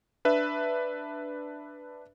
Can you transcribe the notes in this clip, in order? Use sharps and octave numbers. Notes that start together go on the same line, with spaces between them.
D4 B4 E5